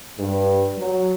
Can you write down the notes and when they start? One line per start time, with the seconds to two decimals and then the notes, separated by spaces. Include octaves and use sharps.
0.19 G2
0.79 F#3